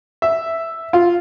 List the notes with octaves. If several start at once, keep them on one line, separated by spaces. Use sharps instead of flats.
E5
F4